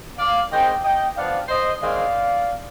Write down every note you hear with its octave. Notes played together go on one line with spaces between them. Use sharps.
D5 F5
D#3 G#3 C4 D#5 G5
D#5 G5
F3 B3 D4 D5 F5
C5 D#5
D#3 G#3 C4 D5 F5